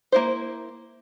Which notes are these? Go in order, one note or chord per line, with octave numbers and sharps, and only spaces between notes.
A#3 E4 C5